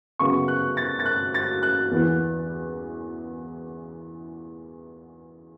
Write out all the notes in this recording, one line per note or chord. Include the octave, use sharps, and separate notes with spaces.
F#2 C#3 F#3 B3 C#6
F#6
A6
A6
F#6
A6
F#6
E2 E3 B3